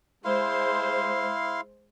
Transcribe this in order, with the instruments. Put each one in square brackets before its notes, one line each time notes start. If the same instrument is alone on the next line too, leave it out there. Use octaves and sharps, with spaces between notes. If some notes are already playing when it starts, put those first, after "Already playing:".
[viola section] G#3 C5 [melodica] E4 F5 C6